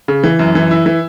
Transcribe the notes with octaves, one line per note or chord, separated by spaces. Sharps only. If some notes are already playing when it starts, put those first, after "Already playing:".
C#3
E3
F#2
E3
E4
E3